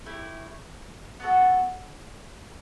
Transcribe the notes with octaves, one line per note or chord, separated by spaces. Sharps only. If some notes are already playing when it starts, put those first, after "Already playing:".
A3 E4 G4
B3 F#4 A4